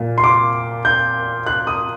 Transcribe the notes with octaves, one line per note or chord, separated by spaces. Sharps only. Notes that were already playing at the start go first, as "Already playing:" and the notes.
Already playing: A#2
C6
D6
G6
F#6
D#6